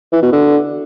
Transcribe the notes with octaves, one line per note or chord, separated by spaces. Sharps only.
E3
B2
D3